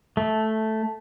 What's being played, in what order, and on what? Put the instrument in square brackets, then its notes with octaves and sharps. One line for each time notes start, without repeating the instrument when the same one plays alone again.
[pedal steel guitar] A3